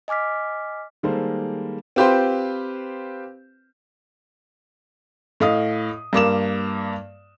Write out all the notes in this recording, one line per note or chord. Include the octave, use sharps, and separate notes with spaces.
D#5 G#5 D6 F6 B6
D#3 G3 G#3 A#3 A4 C5
C4 F4 G4 B4 C5 C6
A2 D#5 F5 D#6
G2 A#3 D6 E7